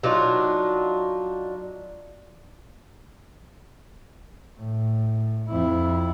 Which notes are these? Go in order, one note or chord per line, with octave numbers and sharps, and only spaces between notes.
F#3 D4 D#4 F4
A2
F2 E4